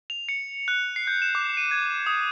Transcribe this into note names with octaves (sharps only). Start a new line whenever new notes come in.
F7
C#7
F#6
C7
G6
E7
D6
D#7
G#6
D#6